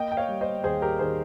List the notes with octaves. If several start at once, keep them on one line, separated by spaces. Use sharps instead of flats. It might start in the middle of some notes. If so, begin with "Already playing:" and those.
Already playing: A#3 D#5 G5
G5
C#5 F5
G3
C5 D#5
D#2 G#4 C5
G4 A#4
D#3 G#4 C5